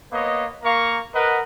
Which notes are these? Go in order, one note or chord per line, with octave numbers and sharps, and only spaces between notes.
A#3 B3 C#5 D#5
A#3 A#4 F5 A#5 C#6
A#4 B4 D#5 F#5